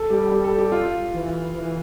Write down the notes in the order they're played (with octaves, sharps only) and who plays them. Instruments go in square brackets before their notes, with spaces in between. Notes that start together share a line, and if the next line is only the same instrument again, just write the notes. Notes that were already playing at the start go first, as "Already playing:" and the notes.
Already playing: [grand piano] A4
[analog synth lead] G3 [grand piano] G4
[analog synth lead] G3 [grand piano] G4
[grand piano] A4
G4
F4
[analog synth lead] E3
E3